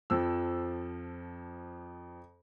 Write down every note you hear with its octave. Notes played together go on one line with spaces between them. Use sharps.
F2 F3 E6